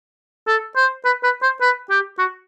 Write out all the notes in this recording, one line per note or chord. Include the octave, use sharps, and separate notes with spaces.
A4
C5
B4
B4
C5
B4
G4
F#4